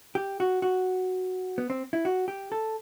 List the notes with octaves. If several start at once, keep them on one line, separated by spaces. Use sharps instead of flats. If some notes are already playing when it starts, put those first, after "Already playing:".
G4
F#4
F#4
B3
C4
E4
F#4
G4
A4